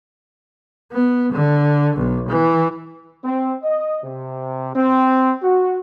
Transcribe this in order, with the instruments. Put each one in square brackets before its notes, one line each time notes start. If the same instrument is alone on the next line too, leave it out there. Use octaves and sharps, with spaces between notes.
[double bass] B3
D3
B1
E3
[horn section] C4
D#5
C3
C4
F#4